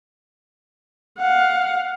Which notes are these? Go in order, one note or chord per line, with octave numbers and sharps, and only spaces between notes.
F5 F#5